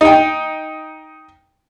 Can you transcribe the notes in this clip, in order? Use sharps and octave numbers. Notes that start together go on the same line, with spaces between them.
D#4 G5